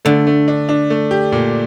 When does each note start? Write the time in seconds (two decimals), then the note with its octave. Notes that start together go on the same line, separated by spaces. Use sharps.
0.05 D3 A3
0.27 A3
0.48 D4
0.69 D4
0.90 A3
1.11 G4
1.32 A#2